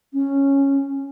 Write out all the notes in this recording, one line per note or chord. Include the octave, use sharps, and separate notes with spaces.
C#4